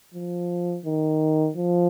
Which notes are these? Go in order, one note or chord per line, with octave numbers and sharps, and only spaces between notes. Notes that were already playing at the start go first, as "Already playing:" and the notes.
F3
D#3
F3